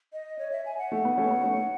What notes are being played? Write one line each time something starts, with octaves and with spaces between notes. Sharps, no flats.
D#5
C#5
E5
G#5
F#5
A3
B3
A3 C#4
B3
A3 C#4